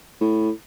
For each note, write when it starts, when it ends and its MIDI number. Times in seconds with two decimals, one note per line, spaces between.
0.21 0.51 45